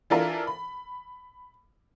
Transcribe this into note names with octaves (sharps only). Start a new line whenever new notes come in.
E3 D4 F4 A4 A#4 E5
B5